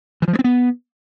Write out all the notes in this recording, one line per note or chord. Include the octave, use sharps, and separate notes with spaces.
E3
F3
G#3
C4
B3